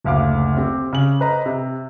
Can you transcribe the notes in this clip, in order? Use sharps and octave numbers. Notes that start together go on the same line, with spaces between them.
F#1 D2 F5 D6
C4 G4
C#3 F#7
B4 C5 D#5 A#5
C3